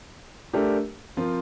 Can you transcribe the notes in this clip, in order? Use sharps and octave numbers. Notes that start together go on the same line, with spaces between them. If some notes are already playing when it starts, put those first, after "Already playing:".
A3 D4 G4 A#4
F3 C4 F4 A#4